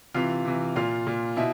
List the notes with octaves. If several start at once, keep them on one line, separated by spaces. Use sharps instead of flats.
C3 E3 F4 F5
C3 E3
A#2 F4 F5
A#2
B2 E4 E5